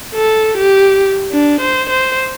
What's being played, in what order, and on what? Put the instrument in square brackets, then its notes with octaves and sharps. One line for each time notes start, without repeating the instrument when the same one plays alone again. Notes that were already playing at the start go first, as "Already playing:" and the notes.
[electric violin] A4
G4
D4
C5
C5